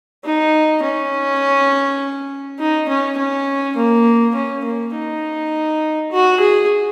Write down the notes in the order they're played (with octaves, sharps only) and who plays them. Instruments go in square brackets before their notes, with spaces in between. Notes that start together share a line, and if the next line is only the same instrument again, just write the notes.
[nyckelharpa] D#4
C#4
D#4
C#4
C#4
A#3
C#4
A#3
D#4
F#4
G#4